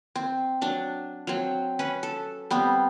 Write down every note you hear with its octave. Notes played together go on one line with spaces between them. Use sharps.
C4
F#3 D4
F#3 C4
C#4 B4
A4
G3 B3 C4